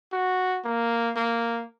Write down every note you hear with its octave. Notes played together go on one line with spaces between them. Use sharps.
F#4
A#3
A#3